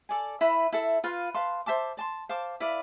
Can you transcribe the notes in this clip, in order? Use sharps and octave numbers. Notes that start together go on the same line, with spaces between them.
A4 D5 G#5
E4 B4 E5 B5
E4 A4 E5
F4 B4 F5
B4 F5 A5 C6
C5 E5 A5 D6
D5 A5 C6
C5 F5 A5 D6
E4 B4 D5 F5